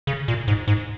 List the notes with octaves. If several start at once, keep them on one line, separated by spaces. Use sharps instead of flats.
C#3
A#2
G#2
G#2